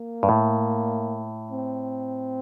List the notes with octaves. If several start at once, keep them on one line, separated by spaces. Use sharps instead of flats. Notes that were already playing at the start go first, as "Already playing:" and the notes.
Already playing: A#3
G2
A2
C4